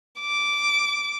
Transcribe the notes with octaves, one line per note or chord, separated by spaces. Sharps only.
D6